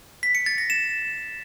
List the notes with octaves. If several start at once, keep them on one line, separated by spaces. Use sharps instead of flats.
B6
C#7
A6
A#6
E7